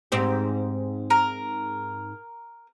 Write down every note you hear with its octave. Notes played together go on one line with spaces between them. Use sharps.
G#2 C4 G4
A#4